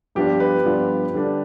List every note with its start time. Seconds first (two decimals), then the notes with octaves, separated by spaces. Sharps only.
0.15 G2 F3 B3 D4 F4 G4
0.40 B4
0.65 G2 F3 B3 D4 F4
1.14 D3 G3 D4